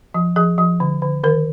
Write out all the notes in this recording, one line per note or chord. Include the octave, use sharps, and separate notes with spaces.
F3
F3 G#4
F3
D3
D3
D#3 A#4